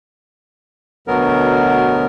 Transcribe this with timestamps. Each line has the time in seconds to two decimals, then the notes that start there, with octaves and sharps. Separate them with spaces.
1.08 D2 B2 F#3 B3 A#4